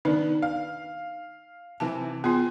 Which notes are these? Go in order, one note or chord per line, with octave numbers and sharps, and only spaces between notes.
D#3 B3 D4 D#4
F5
C3 E3 A5
B3 F4 G#4